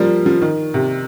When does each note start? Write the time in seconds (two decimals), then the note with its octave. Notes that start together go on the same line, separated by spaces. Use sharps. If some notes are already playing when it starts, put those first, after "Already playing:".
Already playing: F3 G3 A#3
0.26 F3
0.42 D#3
0.74 C3